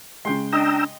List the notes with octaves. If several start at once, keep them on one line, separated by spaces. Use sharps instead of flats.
C#3 G#3 G5 C6
D4 D#5 G5 A#5 E6